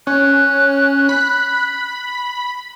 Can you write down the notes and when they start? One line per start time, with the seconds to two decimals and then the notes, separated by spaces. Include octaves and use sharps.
0.07 C#4 F#6
1.09 B5